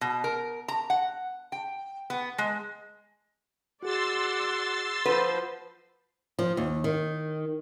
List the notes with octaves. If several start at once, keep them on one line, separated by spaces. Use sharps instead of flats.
B2
A#4
A#5
F#5
G5
B3
G#3
F#4 G#4 D5 F#5 C6 E6 A6
F3 B4 C5 F#5 B5
F3
D#2
D#3